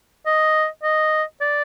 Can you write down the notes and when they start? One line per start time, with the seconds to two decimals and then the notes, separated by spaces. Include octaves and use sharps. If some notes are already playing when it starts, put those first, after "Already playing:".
0.26 D#5
0.83 D#5
1.41 D5